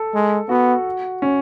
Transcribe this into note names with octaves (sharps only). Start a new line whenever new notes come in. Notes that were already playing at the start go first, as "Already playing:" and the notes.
Already playing: A4
G#3
B3 F#4
C#4